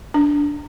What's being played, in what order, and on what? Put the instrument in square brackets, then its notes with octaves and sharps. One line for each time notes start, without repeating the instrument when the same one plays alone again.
[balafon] D4